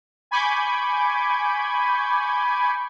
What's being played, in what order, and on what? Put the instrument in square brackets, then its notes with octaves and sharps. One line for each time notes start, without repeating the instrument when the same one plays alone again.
[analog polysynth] G#5 B5 C#6 D6 G6 G#6